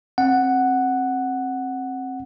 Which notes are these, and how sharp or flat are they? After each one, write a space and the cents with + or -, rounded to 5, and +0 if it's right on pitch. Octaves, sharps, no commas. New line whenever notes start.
C4 +25 F#5 +0